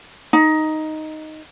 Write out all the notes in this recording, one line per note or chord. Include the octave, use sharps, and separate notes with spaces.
D#4